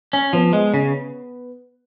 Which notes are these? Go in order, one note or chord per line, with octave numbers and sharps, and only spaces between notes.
C#4
F3 B3
G#3
C#3